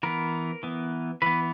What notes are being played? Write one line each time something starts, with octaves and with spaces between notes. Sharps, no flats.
E3 B3 A#4
E3 B3
E3 B3 B4